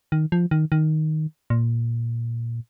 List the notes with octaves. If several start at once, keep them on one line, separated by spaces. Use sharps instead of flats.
D#3
F3
D#3
D#3
A#2